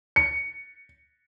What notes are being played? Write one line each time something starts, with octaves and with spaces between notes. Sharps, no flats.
C#7